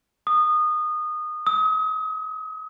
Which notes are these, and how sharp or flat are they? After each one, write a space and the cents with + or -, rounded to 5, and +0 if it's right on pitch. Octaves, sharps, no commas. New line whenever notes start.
D#6 -20
D#6 +40